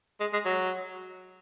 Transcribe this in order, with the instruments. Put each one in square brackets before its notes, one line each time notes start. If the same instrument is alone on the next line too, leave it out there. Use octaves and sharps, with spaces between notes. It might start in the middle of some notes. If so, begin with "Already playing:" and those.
[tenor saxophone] G#3
G#3
F#3